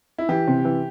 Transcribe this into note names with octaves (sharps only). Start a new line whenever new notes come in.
E4
E3 G4
C3
E3